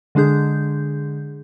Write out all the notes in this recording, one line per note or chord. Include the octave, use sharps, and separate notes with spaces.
D3 G#3 D4 G#4 G6